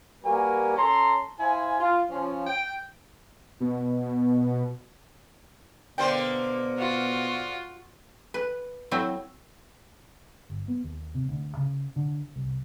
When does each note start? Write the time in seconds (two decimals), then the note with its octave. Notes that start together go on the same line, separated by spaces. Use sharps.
0.23 G3 A#3 F#4 A#4 B4 G#5
0.76 C#4 A4 A5 A#5 C6
1.38 E4 C5 F5 G#5
1.80 F4
2.10 F3 C#4
2.46 G5
3.60 B2
5.98 B2 D3 A#3 C5 G5
6.77 F4 F#4
8.34 B4
8.91 F#3 A3 C4 E4
10.50 G1
10.68 B3
10.84 D#2
11.15 C3
11.29 D2
11.57 C#3
11.96 D3
12.36 C2